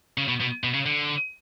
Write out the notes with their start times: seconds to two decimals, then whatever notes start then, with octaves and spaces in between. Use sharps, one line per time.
0.18 C#3
0.28 B2
0.41 B2
0.63 B2
0.74 C#3
0.86 D3